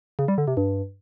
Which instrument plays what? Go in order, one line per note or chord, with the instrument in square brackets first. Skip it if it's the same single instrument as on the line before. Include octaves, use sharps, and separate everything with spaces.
[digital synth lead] C#3
G3
D3
C3
G2